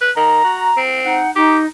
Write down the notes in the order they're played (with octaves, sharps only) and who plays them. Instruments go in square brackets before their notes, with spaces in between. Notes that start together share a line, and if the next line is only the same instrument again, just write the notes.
[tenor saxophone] B4
[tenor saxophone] D#3 [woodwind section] A#5
[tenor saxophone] F#4
C4
[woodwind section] D#4 F#5
[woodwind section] D#4 [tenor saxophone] G4